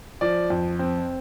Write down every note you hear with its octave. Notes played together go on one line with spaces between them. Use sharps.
F3 D5
F2
C4